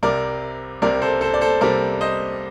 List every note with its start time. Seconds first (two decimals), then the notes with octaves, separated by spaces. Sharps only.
0.03 C2 C3 G3 C4 A#4 D5
0.82 C2 C3 G3 C4 A#4 D5
1.02 A4 C5
1.21 A4 C5
1.34 D5
1.41 A4 C5
1.61 C2 C3 G3 C4 A#4 D5
2.01 C5 D#5